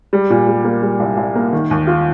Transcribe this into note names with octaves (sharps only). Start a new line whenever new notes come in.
G3
A#2
G3
A#3
G3
C2
C2
A#3
D#3
D#2
F4